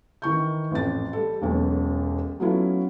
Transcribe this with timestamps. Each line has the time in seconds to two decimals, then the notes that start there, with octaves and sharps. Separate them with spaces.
0.22 D#3 E3 C#6 G6
0.71 A1 F2 A6
1.13 G3 A4
1.42 E1 B1 C#4
2.40 F#3 A3 B3 C#4 E4 F4